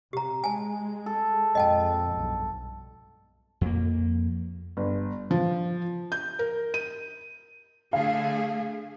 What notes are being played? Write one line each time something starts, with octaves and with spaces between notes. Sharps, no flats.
C3 G4 A#5
G#3 G#5 A5
A4
F2 A#2 G#3 D#5 G5 A5
B1 G2
F2 A#3
G1
F3
G6
A#4
D#7
D3 A3 G#4 F5